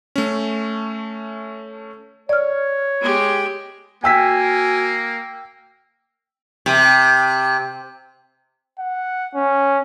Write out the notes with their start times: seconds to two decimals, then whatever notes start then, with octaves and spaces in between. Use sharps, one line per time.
0.16 A3 C#4
2.29 C#5 D5 F6
3.01 G#3 G4
4.04 A#3 F#4 G5 G#5 E6 B6
6.66 C3
8.79 F#5
9.35 C#4